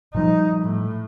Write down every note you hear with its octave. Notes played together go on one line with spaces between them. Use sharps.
A#2 F3 G3 D#4
A2